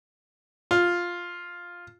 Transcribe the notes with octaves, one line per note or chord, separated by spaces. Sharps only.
F4